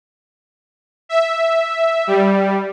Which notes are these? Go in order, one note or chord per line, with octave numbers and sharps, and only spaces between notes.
E5
G3